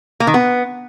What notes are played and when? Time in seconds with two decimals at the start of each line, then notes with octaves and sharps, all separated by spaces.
0.20 A#3
0.27 D#3
0.34 B3